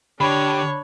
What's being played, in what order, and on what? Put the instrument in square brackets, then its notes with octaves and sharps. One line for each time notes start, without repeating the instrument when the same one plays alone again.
[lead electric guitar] D3 [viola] D4 C#5 [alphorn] G4 [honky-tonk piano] B5